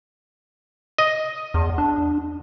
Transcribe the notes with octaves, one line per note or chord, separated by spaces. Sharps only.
D#5
E2
D4